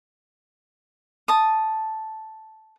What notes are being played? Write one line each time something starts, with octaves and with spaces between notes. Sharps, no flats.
A5 D#6